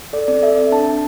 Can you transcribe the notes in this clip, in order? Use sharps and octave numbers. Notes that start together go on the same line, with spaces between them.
A4 D5
C4 D5
A4 E5
C4
D4 A5
D4